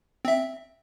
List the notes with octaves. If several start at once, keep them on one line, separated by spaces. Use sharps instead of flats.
C4 E5